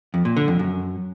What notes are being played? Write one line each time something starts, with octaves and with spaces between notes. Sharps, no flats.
F2
A#2
D3
F2
F#2